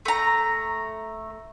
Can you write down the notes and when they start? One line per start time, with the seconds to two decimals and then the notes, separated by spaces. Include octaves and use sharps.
0.05 A3 A#5